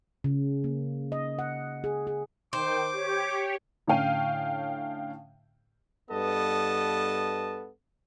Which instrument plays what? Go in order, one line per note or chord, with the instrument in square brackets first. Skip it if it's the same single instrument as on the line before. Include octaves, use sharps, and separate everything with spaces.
[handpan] C#3
A#3
D#5
F#5
G#4
G#4
[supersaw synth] D#3 G5 [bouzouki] C5 [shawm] D6
[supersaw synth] G4 C#5
[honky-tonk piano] A2 D3 C#4 F5 G5 D#7
[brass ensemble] G2 B3 A4 D#5 A5